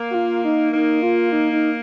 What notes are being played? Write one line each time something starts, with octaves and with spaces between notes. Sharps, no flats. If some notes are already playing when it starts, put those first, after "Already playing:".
Already playing: A#3
F#4
F4
D#4
A#3 D#4
F4
D#4
D#4